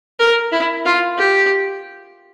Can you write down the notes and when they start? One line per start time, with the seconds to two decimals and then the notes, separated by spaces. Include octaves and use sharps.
0.20 A#4
0.52 E4
0.86 F4
1.18 G4